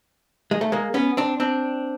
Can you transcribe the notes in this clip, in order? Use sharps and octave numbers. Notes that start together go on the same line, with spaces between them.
G#3
A3
G#3 A#3
B3 C#4
C4 D4
C4 D4